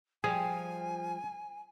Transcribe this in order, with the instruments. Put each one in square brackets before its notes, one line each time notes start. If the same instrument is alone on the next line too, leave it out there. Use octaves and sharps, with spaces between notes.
[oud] F3 G3 [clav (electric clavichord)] G#4 [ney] G#5